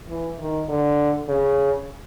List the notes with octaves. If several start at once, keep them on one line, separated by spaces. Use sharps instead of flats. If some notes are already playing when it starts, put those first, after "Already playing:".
E3
D#3
D3
C#3